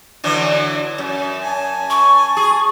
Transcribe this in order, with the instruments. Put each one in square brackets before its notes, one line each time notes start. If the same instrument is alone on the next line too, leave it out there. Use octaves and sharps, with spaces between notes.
[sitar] D3 E3 F#3
F#2
[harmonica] G#5 A5
[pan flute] C#6
[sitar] G#4